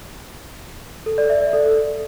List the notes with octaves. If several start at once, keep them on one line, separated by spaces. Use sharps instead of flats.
A4
D5
E5
D5
A4